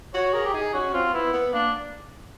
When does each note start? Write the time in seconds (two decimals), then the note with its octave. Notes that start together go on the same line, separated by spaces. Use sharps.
0.14 F#4 C#5
0.34 G#4 A#4
0.45 G4
0.54 D#4 G#4
0.73 C#4 F#4
0.93 C4 F4
1.13 B3 E4
1.33 B3
1.53 A#3 D4